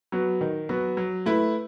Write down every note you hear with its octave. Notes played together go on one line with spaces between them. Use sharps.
F#3 B3 F#4
D#3
F#3 B3 F#4
F#3
A3 E4 B4